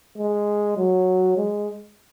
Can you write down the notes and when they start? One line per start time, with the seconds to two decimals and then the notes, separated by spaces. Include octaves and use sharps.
0.18 G#3
0.77 F#3
1.37 G#3